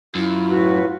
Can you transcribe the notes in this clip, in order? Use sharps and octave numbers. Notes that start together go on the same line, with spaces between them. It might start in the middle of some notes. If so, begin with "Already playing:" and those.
F#2 E4 F4
A2 F#4 B4